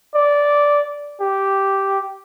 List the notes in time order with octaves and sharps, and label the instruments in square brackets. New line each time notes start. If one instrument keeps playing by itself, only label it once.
[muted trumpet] D5
G4